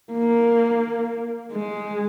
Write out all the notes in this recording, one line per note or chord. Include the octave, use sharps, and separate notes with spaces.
A#3
G#3